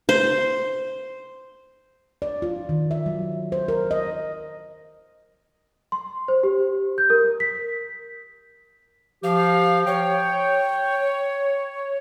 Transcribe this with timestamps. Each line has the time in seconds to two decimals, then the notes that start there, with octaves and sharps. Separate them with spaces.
0.09 C5
2.22 D5
2.42 F4
2.69 D#3
2.91 E5
3.06 F#3
3.52 C5
3.68 A#4
3.91 D#5
5.92 C6
6.28 C5
6.43 G4
6.98 G6
7.10 A#4
7.40 B6
9.23 F3 G4 F5
9.87 C#5 G5